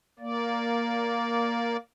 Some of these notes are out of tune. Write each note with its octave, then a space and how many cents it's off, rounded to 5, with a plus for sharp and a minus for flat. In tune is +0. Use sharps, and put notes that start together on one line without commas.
A#3 +0 D5 -15